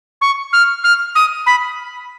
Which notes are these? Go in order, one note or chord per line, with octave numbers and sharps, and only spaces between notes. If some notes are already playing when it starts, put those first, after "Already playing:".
C#6
F6
F6
D#6
B5